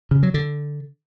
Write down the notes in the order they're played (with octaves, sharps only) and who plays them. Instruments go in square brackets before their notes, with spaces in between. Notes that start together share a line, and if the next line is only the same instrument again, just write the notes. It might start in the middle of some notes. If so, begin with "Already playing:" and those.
[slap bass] C#3
F#3
D3